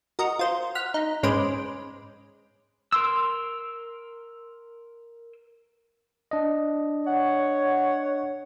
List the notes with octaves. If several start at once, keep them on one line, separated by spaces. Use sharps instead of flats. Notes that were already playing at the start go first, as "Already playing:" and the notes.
F#4 A#4 D#5
F4 C5
F#5 F6 B6
D#4
G#2 G#3 C#4 B4 C5 D6
A#4 C6 E6
D4 D#5
C#5 F#5